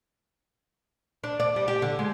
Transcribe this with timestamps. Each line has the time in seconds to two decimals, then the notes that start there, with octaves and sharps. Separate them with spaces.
1.24 D4
1.40 D5
1.56 G3
1.68 G4
1.82 D3
1.99 G#3